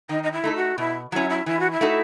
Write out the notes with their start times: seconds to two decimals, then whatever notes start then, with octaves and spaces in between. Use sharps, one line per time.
0.09 D#3 D#4
0.23 D#4
0.32 E4
0.44 A3 D#4 A4
0.55 F#4
0.78 B2 E4
1.12 F#3 C#4 E4
1.29 E4
1.46 E3 E4
1.59 F#4
1.71 E4
1.81 A3 D#4 F#4 A4